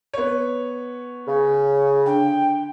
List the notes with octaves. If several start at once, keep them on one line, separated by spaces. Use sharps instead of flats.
B3 C#5
C#3
D3 G5